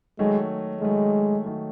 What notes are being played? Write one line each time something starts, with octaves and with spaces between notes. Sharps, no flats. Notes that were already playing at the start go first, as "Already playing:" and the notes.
D#3 F#3 G#3 A3
D#3 F#3 G#3 A3
D#3 F#3 A3